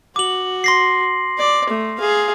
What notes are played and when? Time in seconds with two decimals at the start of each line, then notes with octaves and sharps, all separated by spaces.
0.16 F#4 D6 F#7
0.64 C6 A#6 C7
1.38 D5
1.69 A3
1.99 G#4 F5